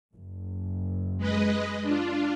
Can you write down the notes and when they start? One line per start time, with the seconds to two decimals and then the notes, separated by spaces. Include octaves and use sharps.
0.14 F#1
1.18 G#3 B4 D#5
1.83 D4 F4